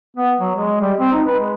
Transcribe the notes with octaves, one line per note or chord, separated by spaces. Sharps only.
B3
F#3
G#3
G3
C4
D#4
B4
G#3